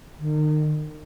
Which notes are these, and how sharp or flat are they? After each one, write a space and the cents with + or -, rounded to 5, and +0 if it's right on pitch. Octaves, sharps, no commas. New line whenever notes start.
D#3 -35